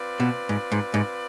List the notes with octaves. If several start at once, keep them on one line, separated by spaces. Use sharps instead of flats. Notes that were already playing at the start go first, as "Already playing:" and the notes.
Already playing: C4 F4 B4 D5
B2
G#2
G#2
G#2